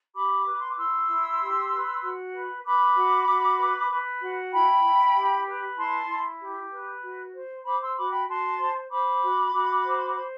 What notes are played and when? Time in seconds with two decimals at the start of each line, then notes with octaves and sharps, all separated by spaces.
0.15 G4 B5 D6
0.46 B4
0.52 B5
0.60 C6
0.68 D6
0.77 E4 C6 E6
1.08 E4
1.40 G4
1.72 B4
2.02 F#4
2.34 B4
2.65 B4 B5 D6
2.96 F#4
3.28 F#4
3.59 B4
3.90 B4
4.21 F#4
4.53 E4 G5 B5
4.84 E4
5.15 G4
5.47 B4
5.78 E4 A5 C6
6.09 E4
6.40 G4
6.72 B4
7.03 F#4
7.34 C5
7.66 C5 B5 D6
7.81 C6 E6
7.97 F#4 B5 D6
8.13 G5 B5
8.28 F#4 A5 C6
8.60 C5
8.90 C5 B5 D6
9.22 F#4
9.53 F#4
9.84 C5
10.16 C5